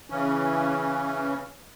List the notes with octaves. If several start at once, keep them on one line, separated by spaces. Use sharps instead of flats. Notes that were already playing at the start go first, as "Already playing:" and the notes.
C#3 E3 C#4